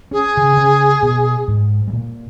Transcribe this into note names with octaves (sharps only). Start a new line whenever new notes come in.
C#4 G#4
C#3 C#4
C#3 C#4
B2 B3
G#2 G#3
G#3
A#2 A#3